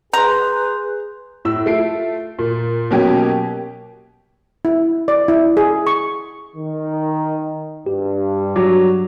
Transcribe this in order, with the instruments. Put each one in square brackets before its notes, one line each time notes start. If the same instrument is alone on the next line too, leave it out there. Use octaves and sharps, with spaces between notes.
[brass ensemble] G#4 [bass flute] B4 [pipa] A#5 [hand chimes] C6 G6
[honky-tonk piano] A2 E6
A3 F4 C7 D7
A#2
B2 F#3 A#3 C#4 G4
[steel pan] E4
D5
E4
G#4
C#6
[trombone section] D#3
[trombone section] G2 [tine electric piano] G4
[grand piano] F#3 [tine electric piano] D6